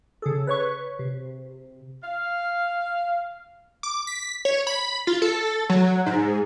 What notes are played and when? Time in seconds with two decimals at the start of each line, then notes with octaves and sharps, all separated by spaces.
0.22 C#3 G#4 A4
0.47 B4 C#5 C#6
0.99 C3
2.03 F5
3.83 D6
4.07 B6
4.45 C#5
4.67 B5
5.07 F4
5.22 A4
5.69 F#3
6.06 G#2